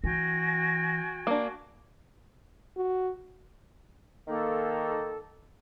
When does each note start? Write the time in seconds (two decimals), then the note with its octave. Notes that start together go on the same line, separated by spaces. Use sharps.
0.04 E3 F#4 G5 G#5 A#6
1.27 A#3 D4
2.77 F#4
4.28 D#3 A#3 A4